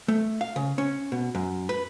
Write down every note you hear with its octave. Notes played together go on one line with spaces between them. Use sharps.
A3
F5
C#3
C#4
B2
F#2
B4